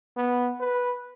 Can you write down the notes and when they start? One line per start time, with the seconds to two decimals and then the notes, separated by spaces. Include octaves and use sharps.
0.17 B3
0.60 B4